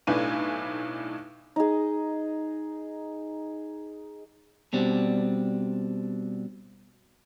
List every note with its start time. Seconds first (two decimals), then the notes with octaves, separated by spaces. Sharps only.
0.07 B1 A2 D4 B4 G#5 D#7
1.56 D#4 G#4
4.73 B2 G3 C4 D4